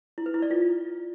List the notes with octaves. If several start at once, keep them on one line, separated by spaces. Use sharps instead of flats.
E4
B4
E4
D5
F4